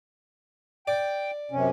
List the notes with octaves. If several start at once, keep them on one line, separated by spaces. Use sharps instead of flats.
D5 G5
F#2 C3 C#4